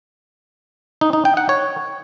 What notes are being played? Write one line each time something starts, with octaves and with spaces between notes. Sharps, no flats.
D#4
D#4
G5
F#5
C#5